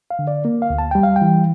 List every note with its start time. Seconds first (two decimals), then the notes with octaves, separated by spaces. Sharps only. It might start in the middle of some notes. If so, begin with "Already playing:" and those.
0.11 F5
0.19 D3
0.27 D5
0.45 A#3
0.62 F5
0.70 D2
0.78 A5
0.91 G3 G5
1.03 F5
1.16 G5
1.22 E3